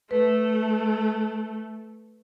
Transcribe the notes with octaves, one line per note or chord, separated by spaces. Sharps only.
A3 B4